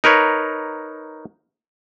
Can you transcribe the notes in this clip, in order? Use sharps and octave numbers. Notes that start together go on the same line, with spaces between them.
D#4 A#4 B4 C#5